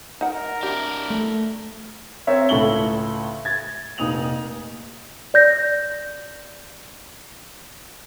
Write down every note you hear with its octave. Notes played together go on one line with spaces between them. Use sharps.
D#4 A#4 F#5
D4 E4 G4
A3
C4 A#4 C#5 E5
C#2 A2 A4 C#6 F#7 G7
G#6 A6
F1 A#2 D#4 D#6 F7 F#7
D5 G6 A#6